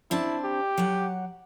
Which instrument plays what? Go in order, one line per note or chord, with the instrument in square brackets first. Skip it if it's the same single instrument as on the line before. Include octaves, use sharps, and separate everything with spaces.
[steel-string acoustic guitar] C4 D4 A5 [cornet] E4
[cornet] G4
[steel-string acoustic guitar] F#3 F#5